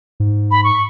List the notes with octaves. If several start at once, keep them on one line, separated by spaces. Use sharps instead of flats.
G#2
B5
C#6